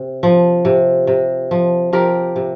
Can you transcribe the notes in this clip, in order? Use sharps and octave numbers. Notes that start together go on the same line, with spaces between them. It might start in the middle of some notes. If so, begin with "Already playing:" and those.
Already playing: C3
F3
C3
C3
F3
F3 G4 A#4
C3